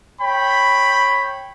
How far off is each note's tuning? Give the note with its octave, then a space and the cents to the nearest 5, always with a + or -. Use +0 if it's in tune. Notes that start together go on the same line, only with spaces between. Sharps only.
C#5 -20 G5 +0 B5 +0